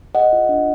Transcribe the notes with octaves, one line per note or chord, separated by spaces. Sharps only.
G#4 D#5 F#5
F4
D4